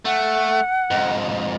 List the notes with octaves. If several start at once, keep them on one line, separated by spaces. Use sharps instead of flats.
A3 F#5
F2 G#2